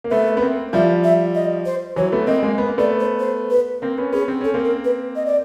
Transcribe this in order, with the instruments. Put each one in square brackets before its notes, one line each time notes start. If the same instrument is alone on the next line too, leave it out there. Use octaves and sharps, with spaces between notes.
[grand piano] A#3
[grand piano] A3 B3 [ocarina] E5
[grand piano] B3
A#3 C4
[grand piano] F3 G3 [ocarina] E5
[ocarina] E5
D#5
C5
[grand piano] E3 F#3 [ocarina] C#5
[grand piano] A3 B3
[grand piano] A#3 C4 [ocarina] D#5
[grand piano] G#3 A#3
B3
A#3
[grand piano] A3 B3 [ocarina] D5
[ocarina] C5
C5
B4
[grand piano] A#3 C4
B3 C#4
[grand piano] B3 C#4 [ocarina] G#4
[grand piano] C4
[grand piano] C#4 [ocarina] A4
[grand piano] A#3 C4
[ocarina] A#4
B4
D#5
D5